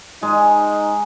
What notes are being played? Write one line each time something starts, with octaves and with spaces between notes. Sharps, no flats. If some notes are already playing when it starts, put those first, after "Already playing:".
G#3 D#4